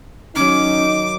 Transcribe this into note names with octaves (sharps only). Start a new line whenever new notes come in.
D#3 F#3 C#4 D#4 D6